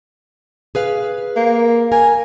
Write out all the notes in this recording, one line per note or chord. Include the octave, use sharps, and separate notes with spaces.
G#4 B4 F5
A#3
A#4 G#5